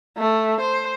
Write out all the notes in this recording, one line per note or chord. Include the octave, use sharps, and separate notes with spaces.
A3
C5